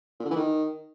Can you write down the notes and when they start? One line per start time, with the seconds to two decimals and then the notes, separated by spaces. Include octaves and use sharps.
0.20 A#2
0.25 D3
0.31 E3
0.36 D#3